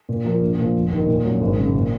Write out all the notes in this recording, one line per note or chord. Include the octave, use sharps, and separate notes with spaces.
A#2
F3 A#3 F4
A#1
A#2 F3
F1
D#2 D#3
A#2
F#3 C#4
G#1
F#2 C#3 F#3
A#2